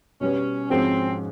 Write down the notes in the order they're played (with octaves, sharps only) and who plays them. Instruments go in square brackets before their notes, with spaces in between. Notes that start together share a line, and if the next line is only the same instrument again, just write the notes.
[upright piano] B2 G3 B3 [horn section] C#4
[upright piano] G#2 F3 G#3 C#4 F#4 [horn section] C4